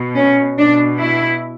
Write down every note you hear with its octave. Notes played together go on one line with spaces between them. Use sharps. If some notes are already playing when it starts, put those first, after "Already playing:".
Already playing: B2
C#4
B2 D4
E4